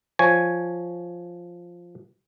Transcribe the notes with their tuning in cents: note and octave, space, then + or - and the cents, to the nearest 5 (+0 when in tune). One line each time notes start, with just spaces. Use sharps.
F3 +0 C#5 +0 G#5 +0